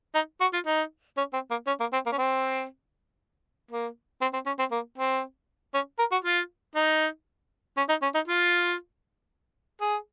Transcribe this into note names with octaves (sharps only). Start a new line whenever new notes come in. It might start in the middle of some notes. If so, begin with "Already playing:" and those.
D#4
F#4
F4
D#4
C#4
C4
A#3
C#4
A#3
C4
A#3
C#4
C4
A#3
C4
C4
C#4
C4
A#3
C4
C#4
A#4
F#4
F4
D#4
C#4
D#4
C#4
D#4
F4
G#4